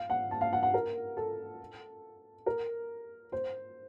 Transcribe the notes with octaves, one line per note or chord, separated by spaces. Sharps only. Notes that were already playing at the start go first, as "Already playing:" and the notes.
Already playing: F5
F#5
A5
F5
F#5
F#5
A#4
A4
A#4
C5